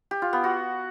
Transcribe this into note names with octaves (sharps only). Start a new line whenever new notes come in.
G4
F4
B3
F#4